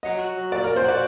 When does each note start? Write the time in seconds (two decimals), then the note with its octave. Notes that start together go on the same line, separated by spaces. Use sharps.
0.03 F#3 D#5
0.19 F#4
0.35 F#3
0.51 A#2 D5
0.64 A#2 A#4
0.76 C5
0.84 F#4 D5